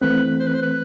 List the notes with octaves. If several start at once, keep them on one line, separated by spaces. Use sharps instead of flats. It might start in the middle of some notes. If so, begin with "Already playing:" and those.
E3 A3 C4 B4
C5
B4
C5
B4